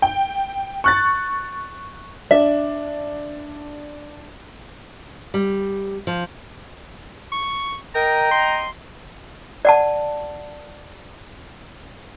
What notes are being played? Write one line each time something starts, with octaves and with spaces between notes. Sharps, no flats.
G5
C#6 F#6 A6
D4 E5
G3
F3
C#6
A#4 D#5 G5 A#5
C6
D5 F#5 A5